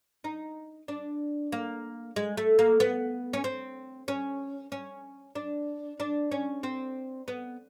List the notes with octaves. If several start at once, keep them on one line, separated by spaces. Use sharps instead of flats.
D#4
D4
A#3
G#3
A3
A#3
B3
C#4
C4
C#4
C#4
D4
D4
C#4
C4
B3